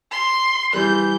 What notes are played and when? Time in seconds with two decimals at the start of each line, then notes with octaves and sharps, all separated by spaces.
0.11 C6
0.73 E3 G3 G6